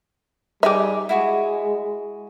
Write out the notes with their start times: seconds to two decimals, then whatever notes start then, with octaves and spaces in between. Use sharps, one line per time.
0.63 G3 D#4 G4 G#4 E5
1.09 G#3 E4 F#4 G#4